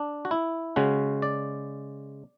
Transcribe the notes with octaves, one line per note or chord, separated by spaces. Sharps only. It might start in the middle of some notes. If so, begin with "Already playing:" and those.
Already playing: D4
F#4
E4
C#3 G#3 C#4 F#4
D5